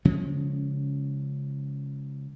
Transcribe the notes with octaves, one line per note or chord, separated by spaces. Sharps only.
C#3 F3 G#3 C#4